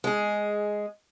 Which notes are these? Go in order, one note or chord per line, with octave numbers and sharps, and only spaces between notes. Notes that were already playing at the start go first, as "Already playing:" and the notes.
G#3 G#4